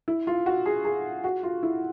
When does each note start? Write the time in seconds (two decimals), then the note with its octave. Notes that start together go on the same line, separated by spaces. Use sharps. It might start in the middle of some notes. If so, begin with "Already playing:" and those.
0.08 E4
0.27 F4
0.46 F#4
0.66 G#4
0.85 G#4
1.24 F#4
1.43 F4
1.63 E4